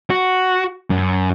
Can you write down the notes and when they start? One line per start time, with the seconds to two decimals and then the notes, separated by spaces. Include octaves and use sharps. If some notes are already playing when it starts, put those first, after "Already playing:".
0.10 F#4
0.90 F#2